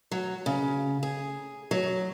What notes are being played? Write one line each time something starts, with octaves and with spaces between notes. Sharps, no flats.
F#3
C#3
G#4
F#3